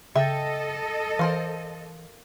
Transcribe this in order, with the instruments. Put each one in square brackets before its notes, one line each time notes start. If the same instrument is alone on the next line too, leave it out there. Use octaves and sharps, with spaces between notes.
[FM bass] C#3 [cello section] A4 D#5 [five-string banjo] E5 G5
[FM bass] E3 [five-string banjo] A#4 C5 F5